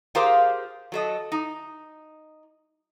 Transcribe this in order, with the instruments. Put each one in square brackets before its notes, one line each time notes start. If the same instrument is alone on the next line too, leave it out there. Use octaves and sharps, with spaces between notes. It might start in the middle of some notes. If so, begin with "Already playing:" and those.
[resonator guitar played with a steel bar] F4 G4 G#4 A#4 C5 F5
F#3 A4 D#5
D#4